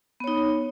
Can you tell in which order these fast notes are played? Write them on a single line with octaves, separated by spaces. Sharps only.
B3 C#5 D#4